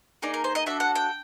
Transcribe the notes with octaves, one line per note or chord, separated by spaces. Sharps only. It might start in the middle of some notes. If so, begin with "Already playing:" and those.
A#3 D#4 G#4 D5
A#4
C5
D#5
D4 F#4 A4 E5
F#5
G5